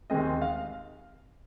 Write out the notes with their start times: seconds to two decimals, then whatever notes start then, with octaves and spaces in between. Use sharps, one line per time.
0.10 D#2 D#3 G#3 C4 D#5
0.42 F5